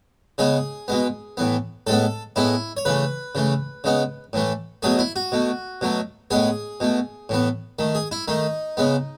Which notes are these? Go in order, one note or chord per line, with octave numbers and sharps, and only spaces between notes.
C#3 G#3 B3 G#4
B2 G#3 B3
A2 E3 B3
A2 G#3 B3 A4
A2 G#3 B3 E4
C#5
C#3 E3 A3 B4
C#3 E3 A3
C#3 G#3 B3
A2 E3 A3
B2 F#3 A3 G#4
E4
F#4
B2 A3
B2 F#3 A3
A2 G#3 B3 G#4
B2 A3
A2 E3 B3
D#3 A3
G#4
E4
D#3 A3 D#4
C#3 G#3 B3